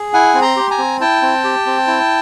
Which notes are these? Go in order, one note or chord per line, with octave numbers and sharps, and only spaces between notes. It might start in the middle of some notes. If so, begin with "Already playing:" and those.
Already playing: G#4
E4 F#5 G#5
C4
A#5 C6
G4
G#5 A#5
C4
E4 G5 A5
C4
G4
C4
E4